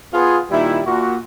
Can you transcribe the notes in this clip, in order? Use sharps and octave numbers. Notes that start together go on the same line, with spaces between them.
B3 F4 G#4
A#2 D#3 G3 E4
A#2 F#4